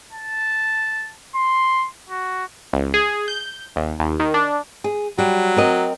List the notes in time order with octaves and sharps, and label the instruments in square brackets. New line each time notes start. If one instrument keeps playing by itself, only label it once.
[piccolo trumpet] A5
C6
F#4
[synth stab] C#2
G#4
G6
D#2
D#2
D#3
D4
[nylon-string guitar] G#4
[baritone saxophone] F#3 [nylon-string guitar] G3
[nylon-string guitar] C4 A#4 D#5